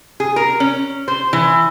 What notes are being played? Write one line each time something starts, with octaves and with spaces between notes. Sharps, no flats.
G#4
A#4
C#4
C5
E3